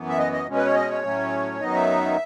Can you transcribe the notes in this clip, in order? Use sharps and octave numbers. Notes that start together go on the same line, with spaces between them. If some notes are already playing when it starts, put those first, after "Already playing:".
Already playing: F#2 E3 B3
E5
D#5
D#5
B2 G#3 C#4
B4
C#5
D#5
C#5
A2 F#3 A3 C#4
F#2 D#3 F#3 B3 D#4 D#5
E5